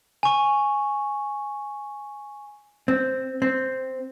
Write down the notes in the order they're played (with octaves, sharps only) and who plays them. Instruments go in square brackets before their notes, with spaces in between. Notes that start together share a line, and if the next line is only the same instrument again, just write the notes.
[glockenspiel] G#5 C#6
[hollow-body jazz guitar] C4
C4